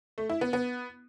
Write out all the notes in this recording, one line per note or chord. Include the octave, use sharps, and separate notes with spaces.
A3
E4
B3
B3